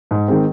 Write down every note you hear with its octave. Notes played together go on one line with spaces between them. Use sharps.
G#2
D#3 G#3 C4